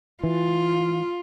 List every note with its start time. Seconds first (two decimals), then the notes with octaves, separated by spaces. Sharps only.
0.24 E3 F4